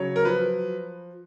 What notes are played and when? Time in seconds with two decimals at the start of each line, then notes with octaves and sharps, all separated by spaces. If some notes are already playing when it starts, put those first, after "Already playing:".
Already playing: C#3 F#3 C#5
0.16 A#4
0.25 F3 B4